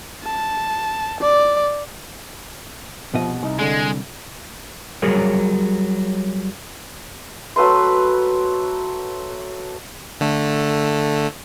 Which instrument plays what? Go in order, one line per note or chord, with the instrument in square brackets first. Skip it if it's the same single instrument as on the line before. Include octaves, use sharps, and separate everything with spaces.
[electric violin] A5
D5
[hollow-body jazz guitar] C2 B2 D#5 [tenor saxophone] F3
[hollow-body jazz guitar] C2 [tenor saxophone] D#4
[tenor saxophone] D3 [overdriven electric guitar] G#3
[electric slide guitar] F#3 G3 G#4 A#4 C#5
[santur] F#3 A3 B4 C6
[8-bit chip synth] D3 A3